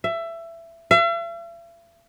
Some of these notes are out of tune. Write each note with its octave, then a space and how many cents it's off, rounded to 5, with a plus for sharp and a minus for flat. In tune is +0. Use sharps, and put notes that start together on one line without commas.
E5 +20
E5 +45